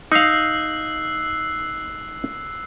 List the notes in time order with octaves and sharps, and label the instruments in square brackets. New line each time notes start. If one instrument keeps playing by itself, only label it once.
[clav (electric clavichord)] D#4 F5 [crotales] E6 F#6 C7